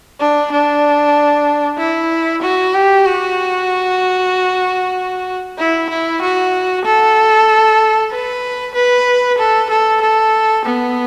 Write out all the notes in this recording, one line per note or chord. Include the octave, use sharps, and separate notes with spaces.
D4
D4
E4
F#4
G4
F#4
E4
E4
F#4
A4
B4
B4
A4
A4
A4
B3